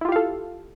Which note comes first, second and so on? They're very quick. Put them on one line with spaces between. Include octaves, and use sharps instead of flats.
E4 F4 G4 F5 A4